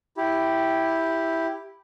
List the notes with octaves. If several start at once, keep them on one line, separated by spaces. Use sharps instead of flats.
E4 G4